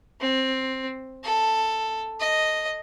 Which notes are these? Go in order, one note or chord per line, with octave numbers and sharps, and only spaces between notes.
C4
A4
D#5